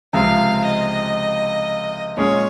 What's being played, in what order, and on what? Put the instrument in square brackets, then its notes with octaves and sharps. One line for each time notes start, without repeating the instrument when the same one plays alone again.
[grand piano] C#2 C3 F3 G#3 C4 [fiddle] F5
[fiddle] D#5
[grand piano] A#2 G#3 C#4 G#4 [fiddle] C#5